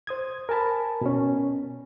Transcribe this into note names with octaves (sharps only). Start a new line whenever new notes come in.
C5 D#6 G#6
A#4 G#5 A5 B5
B2 C#4